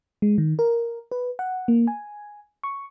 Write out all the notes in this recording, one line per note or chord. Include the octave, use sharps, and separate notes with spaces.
G#3
D#3
A#4
B4
F#5
A#3
G#5
C#6